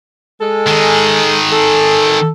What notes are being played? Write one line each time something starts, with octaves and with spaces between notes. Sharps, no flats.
G#3 A4
D#3 G#4
A4